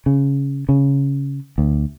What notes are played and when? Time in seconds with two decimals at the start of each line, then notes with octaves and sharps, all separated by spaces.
0.06 C#3
0.69 C#3
1.58 D2